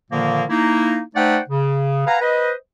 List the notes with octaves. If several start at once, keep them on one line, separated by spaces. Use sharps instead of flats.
A#2 D3 D#3 F3 A#3
A#3 D#4 E4
A3 D#4 C5 D5 F#5 G5
C#3
B4 F5 F#5 G#5 A#5
B4 C5 D#5